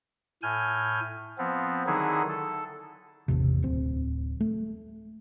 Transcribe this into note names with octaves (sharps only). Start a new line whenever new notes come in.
A2 G#5 F6 G6
F3 B3 C4
D3 D#3 F#3 D#4 E4 G#4
A4
G#1 E2 C3
D1 C4
A3